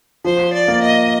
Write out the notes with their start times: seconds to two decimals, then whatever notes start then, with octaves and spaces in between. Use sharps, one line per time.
0.25 F3 C5
0.53 D5
0.68 A#3
0.83 D#5